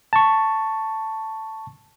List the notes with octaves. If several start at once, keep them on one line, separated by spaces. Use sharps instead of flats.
A5 C#6